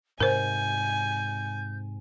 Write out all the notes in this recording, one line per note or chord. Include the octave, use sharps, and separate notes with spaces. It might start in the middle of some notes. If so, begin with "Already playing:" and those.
G#2 C3 A#4 C5 G#5 G6